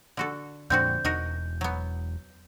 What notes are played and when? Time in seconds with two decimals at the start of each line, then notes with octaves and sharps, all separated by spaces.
0.17 D3 F#4 A4
0.70 F2 A#2 D3 C4 F#4 G6
1.05 E1 D#4 F#4 A#4
1.61 F#3 B3